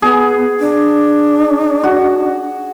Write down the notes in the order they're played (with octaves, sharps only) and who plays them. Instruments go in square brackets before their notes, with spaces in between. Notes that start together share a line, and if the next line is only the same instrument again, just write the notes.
[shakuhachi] B3 [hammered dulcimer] G#4
[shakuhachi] D4
[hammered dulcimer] F#4